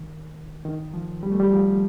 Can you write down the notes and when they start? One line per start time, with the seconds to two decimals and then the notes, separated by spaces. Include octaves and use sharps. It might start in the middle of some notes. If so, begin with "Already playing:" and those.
Already playing: D#3
0.65 D#3
0.94 F3
1.23 G3
1.31 A3
1.40 G3
1.52 F3